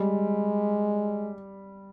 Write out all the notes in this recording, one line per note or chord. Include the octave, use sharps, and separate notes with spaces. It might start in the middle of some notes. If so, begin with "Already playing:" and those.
Already playing: G3 G#3